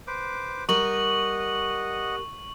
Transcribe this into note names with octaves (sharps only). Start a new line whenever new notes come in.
B4 C5 D6
G3 A#4 D#5 F#5 C#6 F#7